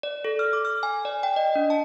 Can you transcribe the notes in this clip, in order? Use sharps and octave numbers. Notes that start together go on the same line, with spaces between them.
D5
A4
F6
D6
F6
G#5
D5
G5
D#5
D4
A5